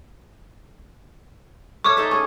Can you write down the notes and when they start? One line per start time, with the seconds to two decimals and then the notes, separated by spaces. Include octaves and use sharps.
1.84 A3 C#5 C#6 D6
1.97 D#4 A4 E5
2.11 C#4 G#4